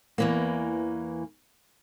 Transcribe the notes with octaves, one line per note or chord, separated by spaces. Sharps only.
E2 E3 A#3